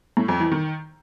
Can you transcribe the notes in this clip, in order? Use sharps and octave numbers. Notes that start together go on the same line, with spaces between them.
A2
F2
E3
D#3